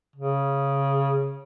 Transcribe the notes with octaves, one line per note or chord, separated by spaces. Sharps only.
C#3